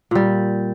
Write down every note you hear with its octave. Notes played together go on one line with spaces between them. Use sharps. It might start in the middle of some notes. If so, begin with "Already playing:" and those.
A#2 G3